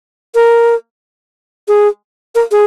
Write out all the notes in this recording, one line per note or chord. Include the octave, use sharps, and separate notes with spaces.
A#4
G#4
A#4
G#4